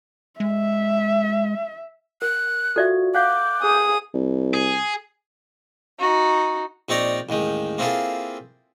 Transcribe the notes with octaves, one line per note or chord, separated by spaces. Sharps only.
G#3 E5
A#4 F#6
F4 F#4 A4 D5 E5
F5 F#5 D6 F#6 G6
G#4 D#6
C2
G#4
D#4 F#4
A#1 C4 D#4 C#5 D5 A#5
A1 D#2 D#3 G#3
A#3 C4 E4 F4 G#4 A4